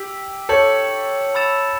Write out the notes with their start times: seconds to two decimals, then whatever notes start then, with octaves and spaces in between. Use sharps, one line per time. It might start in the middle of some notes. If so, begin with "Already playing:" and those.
Already playing: G4 E6 B6 F#7
0.49 A4 C#5 G6 C#7 F#7
1.35 B5 E6 A6 E7